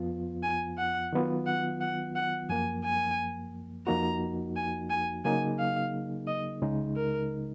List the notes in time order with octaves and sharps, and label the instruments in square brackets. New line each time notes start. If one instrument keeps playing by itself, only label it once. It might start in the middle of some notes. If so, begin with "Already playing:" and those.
Already playing: [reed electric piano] F2 F3 B3 F4
[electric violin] G#5
F#5
[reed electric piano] D#3 F#3 B3 F4
[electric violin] F#5
F#5
F#5
[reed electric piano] F#2 F3 A#3 [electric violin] G#5
[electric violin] G#5
[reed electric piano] F2 F3 A#3 D#4 F#4 [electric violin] A#5
[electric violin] G#5
G#5
[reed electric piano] C#3 F#3 A#3 D#4 G#4 [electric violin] G#5
[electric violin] F5
D#5
[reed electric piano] C#2 C#3 G#3 D#4
[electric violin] A#4